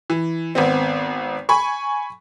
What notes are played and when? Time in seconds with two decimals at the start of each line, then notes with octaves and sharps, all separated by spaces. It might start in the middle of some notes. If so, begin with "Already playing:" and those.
0.10 E3
0.55 G#1 B3 C4
1.49 G#5 B5 C#6